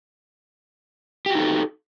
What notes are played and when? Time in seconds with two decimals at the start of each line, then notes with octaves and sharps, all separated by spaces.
1.26 G4
1.30 F#4
1.35 D#4
1.39 A4